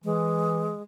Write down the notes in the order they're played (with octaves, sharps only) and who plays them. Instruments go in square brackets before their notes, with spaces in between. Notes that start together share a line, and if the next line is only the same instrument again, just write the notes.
[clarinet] E3 [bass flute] G#3